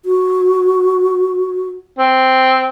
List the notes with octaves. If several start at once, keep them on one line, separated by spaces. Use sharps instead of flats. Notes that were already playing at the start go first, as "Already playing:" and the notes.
F#4
C4